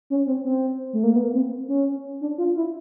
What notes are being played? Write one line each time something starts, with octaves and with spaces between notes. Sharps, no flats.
C#4
C4
C4
A3
A#3
B3
C4
C#4
D4
F4
E4